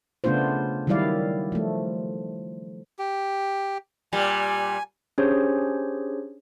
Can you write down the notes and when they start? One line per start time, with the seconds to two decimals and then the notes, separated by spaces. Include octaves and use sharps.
0.24 C#3 A3 B3 D4 F4 C5
0.87 D#3 F#3 G3 E4 D5 F5
1.52 F3 A3
2.99 G4
4.13 A#2 G3 G#5
5.18 C#4 D4 G4 G#4 C5 C#5